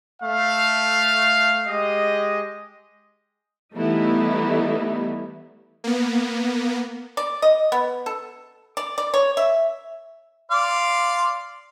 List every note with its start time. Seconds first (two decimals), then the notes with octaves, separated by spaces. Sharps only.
0.23 A3 F5
1.65 G#3 G4 D#5
3.74 E3 G3 A3 B3 D#4 E4
5.84 A#3 B3
7.17 D5
7.42 D#5
7.72 B3
8.06 A4
8.77 D5
8.98 D5
9.14 C#5
9.37 E5
10.51 D5 F5 C6